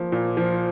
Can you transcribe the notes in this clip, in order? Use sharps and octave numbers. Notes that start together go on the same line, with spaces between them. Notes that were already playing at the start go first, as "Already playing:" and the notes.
Already playing: F3 A#3
A#2
F3